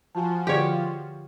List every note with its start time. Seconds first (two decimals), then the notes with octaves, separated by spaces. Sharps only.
0.15 F3 F4 F#4 G#5 A5
0.47 D3 G4 G#4 C#5 D5